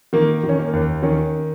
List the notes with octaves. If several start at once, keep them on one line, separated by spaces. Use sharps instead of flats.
D#3 A#3
D#3
C#4
A#3
D#2
D#3 C#4